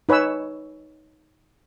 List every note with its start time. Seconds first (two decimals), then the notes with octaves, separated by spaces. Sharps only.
0.09 D#4 B4 C#5 G#5 E6